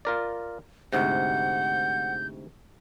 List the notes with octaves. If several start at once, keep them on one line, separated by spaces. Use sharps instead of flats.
F4 A#4 D5
D2 G#2 C3 F#5 G6